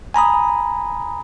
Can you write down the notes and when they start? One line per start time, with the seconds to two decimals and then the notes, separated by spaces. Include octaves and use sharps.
0.14 G#5 A#5 B5 D#6